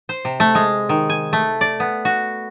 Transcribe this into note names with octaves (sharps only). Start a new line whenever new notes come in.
C5
C3
A3
G#3
D#3
G#5
A3
D5
B3
F#4